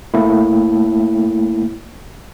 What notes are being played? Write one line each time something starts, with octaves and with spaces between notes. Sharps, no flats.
A3 A#3 E4